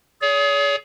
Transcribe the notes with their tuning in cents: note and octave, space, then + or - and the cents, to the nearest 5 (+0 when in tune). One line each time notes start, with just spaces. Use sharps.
G#4 +20 C#5 +45